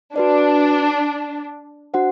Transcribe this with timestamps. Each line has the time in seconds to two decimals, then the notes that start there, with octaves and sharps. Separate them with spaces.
0.15 D4 F#4 B4 D5
1.94 D4 F#4 C5 F#5